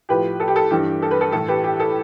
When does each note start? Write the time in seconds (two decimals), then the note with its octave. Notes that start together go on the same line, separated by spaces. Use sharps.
0.09 A2 F3 G4 B4
0.40 A4
0.48 G4
0.56 A4
0.71 G2 E3 G4
1.02 A4
1.11 B4
1.21 A4
1.32 A2 E3 A4
1.48 G4 B4
1.64 G4
1.80 A4